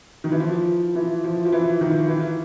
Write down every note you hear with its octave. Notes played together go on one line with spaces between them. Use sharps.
D#3
E3
F3
E3
F3
F3
E3
D#3
E3